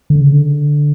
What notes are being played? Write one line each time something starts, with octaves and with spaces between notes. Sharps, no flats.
D3
C#3
D3